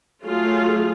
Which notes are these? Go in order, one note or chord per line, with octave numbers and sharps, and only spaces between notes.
F#3 A3 F4 G#4